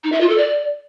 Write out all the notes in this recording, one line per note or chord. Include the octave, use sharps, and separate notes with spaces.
D#4
E5
F4
A4
D5